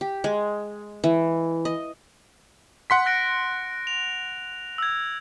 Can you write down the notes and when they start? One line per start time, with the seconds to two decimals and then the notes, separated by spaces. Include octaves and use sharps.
0.01 G4
0.24 G#3
1.04 E3
1.65 D#5
2.90 F#5 C6 B6
3.06 F#6 A#6 D7
3.87 F7
4.78 E6 G#6